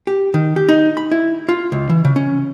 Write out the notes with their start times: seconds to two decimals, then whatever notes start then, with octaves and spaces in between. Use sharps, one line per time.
0.07 G4
0.34 D#3
0.56 G4
0.69 D#4
0.97 B5
1.11 E4
1.49 F4
1.72 C#2
1.89 E3
2.05 C#3
2.16 C#4